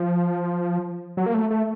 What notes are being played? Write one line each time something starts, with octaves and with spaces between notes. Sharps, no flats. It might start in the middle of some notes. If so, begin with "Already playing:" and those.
Already playing: F3
F#3
A#3
A3
A3